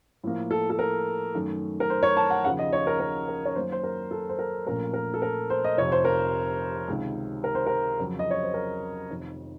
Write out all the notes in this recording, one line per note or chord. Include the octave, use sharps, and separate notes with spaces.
A2 F3 A#3
A4
A4
A#4
F#2 D#3 A3
A#4
C5
C#5
A5
F#5
D#2 C#3 F3 F#5
D#5
C#5
A#4
A#4
A#4
C#5
F#2 D#3 F#3 A#3 C#4 C5
C5
A#4
A4
C5
A#4
A#1 A#2 A3 C#4 A#4
A#4
A4
A#4
C5
D#5
F1 F2 C3 F3 C#5
C5
A#4
C#2 C3 D#3
A#4
C5
A#4
F2 C#3 F#3 C4
D#5
C#5
C5
A#4
F1 F2 D#3